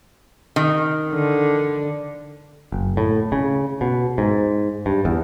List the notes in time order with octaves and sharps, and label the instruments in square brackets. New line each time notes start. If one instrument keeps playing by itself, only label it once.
[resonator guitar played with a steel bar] D#3
[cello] D3
[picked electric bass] F#1
A2
C#3
B2
G#2
G2
E2